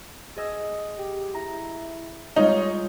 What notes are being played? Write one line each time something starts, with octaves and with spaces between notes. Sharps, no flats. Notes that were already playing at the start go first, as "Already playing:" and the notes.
G#4 D#5 E6
G4
E4 A#5
G3 G#3 D#4 F4 C#5